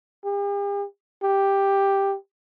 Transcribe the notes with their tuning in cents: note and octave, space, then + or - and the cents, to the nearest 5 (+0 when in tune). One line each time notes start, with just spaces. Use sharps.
G4 +45
G4 +5